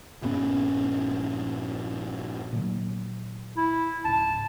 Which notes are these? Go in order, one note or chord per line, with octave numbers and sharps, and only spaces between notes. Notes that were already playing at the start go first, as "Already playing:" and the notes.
A#1 G2 B3 C#4
A#2 D#3 F#3
E4
C#2 G#2 A5